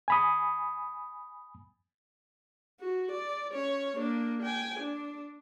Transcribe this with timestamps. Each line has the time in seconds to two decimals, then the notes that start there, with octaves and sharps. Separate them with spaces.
0.08 G#5 B5 D#6
2.80 F#4
3.12 D5
3.53 C#4 C#5
3.97 A#3 D4
4.43 G5 G#5
4.80 D4